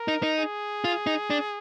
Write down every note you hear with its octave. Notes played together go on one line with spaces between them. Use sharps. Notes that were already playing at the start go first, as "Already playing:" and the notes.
Already playing: A#4
D#4
D#4
G#4
F4
D#4
D4